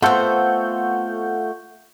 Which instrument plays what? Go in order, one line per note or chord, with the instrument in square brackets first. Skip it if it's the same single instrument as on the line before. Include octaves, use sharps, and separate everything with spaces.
[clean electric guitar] A3 F4 A4 [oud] B3 C4 [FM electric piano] F#5 C#6 G6